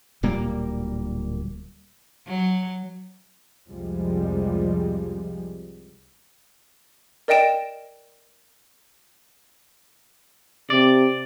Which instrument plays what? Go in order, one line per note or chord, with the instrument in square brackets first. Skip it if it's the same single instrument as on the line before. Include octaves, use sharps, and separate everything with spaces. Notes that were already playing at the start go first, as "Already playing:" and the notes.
[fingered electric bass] D1 A#2 G3 A#3
[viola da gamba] F#3
[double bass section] C2 F2 C3 F3 G3 G#3
[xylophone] A#4 D5 D#5 G5 D7 E7
[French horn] C3 [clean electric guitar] D5